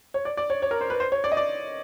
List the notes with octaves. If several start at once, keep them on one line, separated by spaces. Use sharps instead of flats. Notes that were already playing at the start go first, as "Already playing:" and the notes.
C#5
D5
D5
C#5
C#5
A#4
C5
B4
C5
C#5
D5
D#5
D5